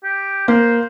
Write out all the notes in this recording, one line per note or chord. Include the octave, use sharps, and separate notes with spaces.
G4
A#3 C5